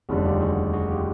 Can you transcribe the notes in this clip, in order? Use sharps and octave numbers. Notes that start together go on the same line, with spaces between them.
F1 D#2 D3 G3 F#4 G#4
F4 G4
F#4 G#4
F#4 G#4
F4 G4